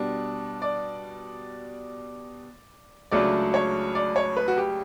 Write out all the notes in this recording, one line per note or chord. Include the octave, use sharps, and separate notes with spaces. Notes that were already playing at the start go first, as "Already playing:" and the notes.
Already playing: B2 G3 D4
D5
C#2 C#3 F#3 A3 D4 D5
C#5
D5
C#5
B4
F#4
G4